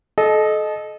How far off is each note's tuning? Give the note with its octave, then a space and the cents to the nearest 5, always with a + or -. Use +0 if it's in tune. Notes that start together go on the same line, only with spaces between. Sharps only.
A4 -30 D#5 -10